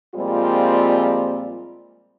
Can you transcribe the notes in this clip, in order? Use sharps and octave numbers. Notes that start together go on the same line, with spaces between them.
A#2 F3 G3 G#3 C4 F4